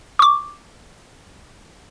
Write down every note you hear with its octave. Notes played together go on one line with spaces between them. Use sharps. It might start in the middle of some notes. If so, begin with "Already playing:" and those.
C#6 D6